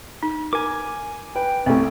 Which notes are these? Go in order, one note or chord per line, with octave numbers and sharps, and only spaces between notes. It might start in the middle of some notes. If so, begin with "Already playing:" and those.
D#4
A#4 G#5 D6
B4 G5
C2 A3 C4 C#4